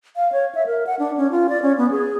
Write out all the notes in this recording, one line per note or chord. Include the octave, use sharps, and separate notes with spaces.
F5
C#5
E5
A#4
F#5
D4
C#4
F4
D5
C#4
B3
G#4